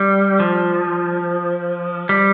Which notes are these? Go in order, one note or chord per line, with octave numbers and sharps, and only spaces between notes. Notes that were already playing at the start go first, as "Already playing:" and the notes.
Already playing: G3
F3
G3